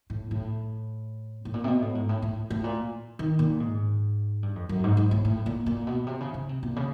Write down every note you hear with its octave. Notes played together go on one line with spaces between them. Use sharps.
A2
A2
A2
A#2
C3
B2
A2
G#2
A2
A2
A2
A#2
D#3
A#2
G#2
G2
F2
F#2
G#2
G#2
A2
A2
A#2
A#2
B2
C3
C#3
C#3
C3
A#2
C#3